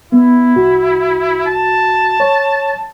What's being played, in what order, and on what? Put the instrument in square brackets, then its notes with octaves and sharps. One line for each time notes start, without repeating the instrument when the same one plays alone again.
[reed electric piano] B3 [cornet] E4
[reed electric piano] C2 F#4
[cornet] A5
[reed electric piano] C#5